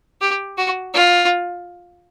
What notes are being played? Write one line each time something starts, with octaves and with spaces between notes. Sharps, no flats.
G4
F#4
F4